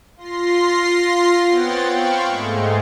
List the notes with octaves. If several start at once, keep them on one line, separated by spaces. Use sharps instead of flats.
F4 C6 A#6 C7
B3 C4 C#5 F#5 G5 A6
C5 F5 G5 B5 C#6
G#2 G#3 A3